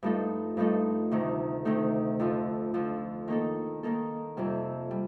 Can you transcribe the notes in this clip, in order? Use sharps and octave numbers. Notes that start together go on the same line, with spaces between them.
G2 F3 A3 D#4 A4
G2 F3 A3 D#4 A4
D2 C3 D#3 A3 D#4
D2 C3 D#3 A3 D#4
F2 D3 F3
F2 D3 F3
D#3 A#3 D#4 A4
D#3 A#3 D#4 A4
F2 C3 G3
G3